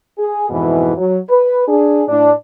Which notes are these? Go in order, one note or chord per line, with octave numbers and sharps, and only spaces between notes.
G#4
F2 G#2 B2 E3
F#3
B4
D4 G#4
A2 D4